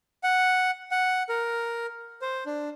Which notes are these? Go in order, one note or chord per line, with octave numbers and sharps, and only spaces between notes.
F#5
F#5
A#4
C5
D4